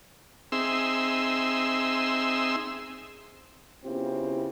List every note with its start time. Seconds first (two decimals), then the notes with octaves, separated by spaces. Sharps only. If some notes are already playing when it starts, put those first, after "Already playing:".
0.52 C4 D#4 G#4 E5 C6 E6
3.85 C#3 B3 C4 E4 F4 G4